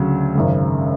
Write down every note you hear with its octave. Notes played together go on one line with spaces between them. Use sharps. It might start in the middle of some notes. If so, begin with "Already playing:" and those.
Already playing: D2 C#3 F#3
G#1 F#2 C#3